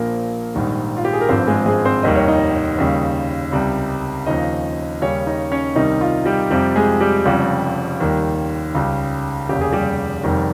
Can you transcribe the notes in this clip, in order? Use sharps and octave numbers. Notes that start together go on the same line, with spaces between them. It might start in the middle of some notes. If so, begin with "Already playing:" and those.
Already playing: A#1 A#2 F3 A#3 A#4
A#1 G#2 D#3 G3
F4
G4
G#4
A#4
G#1 G2 F3 C4 C5
G#3 G#4
G#3 G#4
C4 C5
F1 D#2 D#3 G3 D#5
C#5
D#4 D#5
D#2 C#3 G3
C#2 C3 G3
D#2 C#3 F3 D#4 D#5
D#2 C#3 G3 C#4 C#5
D#4 D#5
C#4 C#5
C2 C3 D#3 G3 D#4
F4
G3 G4
F2 C3 F3 G3 G4
G#3 G#4
G3 G4
F1 F2 C#3 G3 F4
D#2 D#3 G3
C#2 C#3 G3
F1 D#2 C#3 G4
G#4
G3 G4
F1 F2 D#3 G3